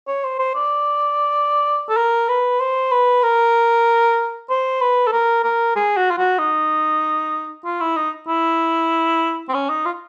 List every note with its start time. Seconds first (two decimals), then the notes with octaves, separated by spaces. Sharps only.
0.07 C#5
0.24 C5
0.39 C5
0.55 D5
1.89 A4
1.97 A#4
2.28 B4
2.60 C5
2.91 B4
3.23 A#4
4.50 C5
4.81 B4
5.07 A4
5.12 A#4
5.44 A#4
5.76 G#4
5.97 F#4
6.11 F4
6.18 F#4
6.38 D#4
7.65 F4
7.80 E4
7.96 D#4
8.28 E4
9.49 C4
9.54 C#4
9.69 D#4
9.85 F4